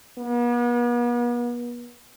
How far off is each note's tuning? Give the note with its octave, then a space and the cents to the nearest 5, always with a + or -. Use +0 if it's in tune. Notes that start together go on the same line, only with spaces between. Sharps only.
B3 -40